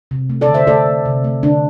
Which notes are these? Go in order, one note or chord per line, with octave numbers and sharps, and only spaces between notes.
C3
A3
A4 D5
D3
C5 E5
A3 A4 D5
A3
C3
A3
D3 D4